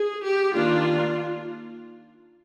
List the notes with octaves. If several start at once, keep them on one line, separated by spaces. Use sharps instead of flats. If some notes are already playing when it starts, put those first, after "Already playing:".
Already playing: G#4
G4
D#3 A#3 D4 F4